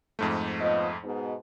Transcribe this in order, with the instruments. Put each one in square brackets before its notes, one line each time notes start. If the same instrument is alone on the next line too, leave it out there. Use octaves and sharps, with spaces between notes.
[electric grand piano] F2 G#2 A3
[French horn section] F3 B3 D#5
G#2 B2